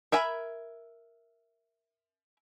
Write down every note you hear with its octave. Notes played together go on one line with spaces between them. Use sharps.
A#4 E5 G#5 B5